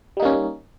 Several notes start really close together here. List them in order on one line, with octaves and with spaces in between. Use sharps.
G3 D#4 A#3 C#4